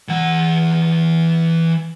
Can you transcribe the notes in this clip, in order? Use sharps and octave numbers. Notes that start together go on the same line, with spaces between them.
E3 F#5